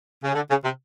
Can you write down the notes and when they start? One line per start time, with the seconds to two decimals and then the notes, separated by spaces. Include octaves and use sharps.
0.24 C#3
0.35 D3
0.50 C#3
0.64 C3